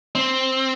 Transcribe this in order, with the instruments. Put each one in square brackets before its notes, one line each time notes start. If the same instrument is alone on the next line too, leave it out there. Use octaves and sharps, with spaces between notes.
[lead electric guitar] C4